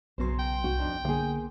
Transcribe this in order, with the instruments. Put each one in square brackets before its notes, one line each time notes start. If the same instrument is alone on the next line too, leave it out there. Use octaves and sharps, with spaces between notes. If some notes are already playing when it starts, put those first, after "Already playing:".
[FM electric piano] B1 B3 C6 [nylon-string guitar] C#3 F#3 C5
[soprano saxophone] G5
[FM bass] C2 [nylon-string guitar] F#4
[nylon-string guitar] F2 D4 D#4
[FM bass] D3 [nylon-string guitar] A#3 G#4